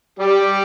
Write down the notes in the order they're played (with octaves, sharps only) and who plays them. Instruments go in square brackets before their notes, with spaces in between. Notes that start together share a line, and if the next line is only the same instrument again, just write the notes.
[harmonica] G3 G4